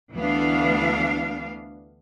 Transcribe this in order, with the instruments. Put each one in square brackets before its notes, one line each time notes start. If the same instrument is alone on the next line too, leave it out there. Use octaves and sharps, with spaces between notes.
[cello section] D2 E3 B3 D4 F5